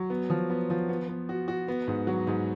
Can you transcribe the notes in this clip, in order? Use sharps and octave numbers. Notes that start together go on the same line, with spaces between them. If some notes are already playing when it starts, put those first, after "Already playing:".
Already playing: F#3
B3
F3
B3
F3
B3
B3
F#4
F#4
B3
G#2
F#3
G#2